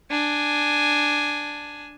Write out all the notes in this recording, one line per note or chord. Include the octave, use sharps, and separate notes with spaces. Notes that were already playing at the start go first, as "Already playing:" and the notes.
D4 G#5